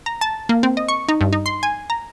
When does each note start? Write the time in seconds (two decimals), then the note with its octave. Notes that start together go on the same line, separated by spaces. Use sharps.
0.06 A#5
0.21 A5
0.49 A#3
0.63 C4
0.77 D#5
0.88 C#6
1.08 D#4
1.21 G2
1.33 D#4
1.46 C6
1.63 G#5
1.90 A#5